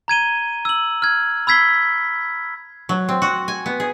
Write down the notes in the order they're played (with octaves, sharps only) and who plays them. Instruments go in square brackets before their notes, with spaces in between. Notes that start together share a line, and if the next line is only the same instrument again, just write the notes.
[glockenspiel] A#5 G#6 D#7 G7
E6 F#7
F6 G#6
B5 E6 G#6 B6 C7 G7
[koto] F#3
C4
F#4
G#5
B3
G#4